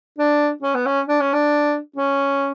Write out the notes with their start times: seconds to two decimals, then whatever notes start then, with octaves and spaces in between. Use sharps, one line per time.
0.18 D4
0.63 C#4
0.75 B3
0.86 C#4
1.07 D4
1.21 C#4
1.33 D4
1.96 C#4